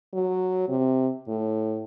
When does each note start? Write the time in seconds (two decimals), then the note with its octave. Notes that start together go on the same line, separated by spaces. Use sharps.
0.14 F#3
0.69 C3
1.28 A2